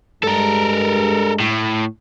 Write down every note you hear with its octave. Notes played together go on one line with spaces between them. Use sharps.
G2 G#3 A4 A#4
A2